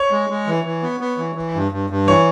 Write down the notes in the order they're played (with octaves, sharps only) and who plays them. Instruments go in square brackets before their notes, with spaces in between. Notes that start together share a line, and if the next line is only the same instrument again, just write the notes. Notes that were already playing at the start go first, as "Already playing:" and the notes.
Already playing: [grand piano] C#5
[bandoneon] G#3
G#3
E3
E3
B3
B3
E3
E3
G2
G2
G2
[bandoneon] E3 [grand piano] C#5